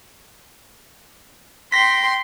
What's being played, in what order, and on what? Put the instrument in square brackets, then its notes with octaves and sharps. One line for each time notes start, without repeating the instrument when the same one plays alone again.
[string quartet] G5 C6 [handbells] A#6 B6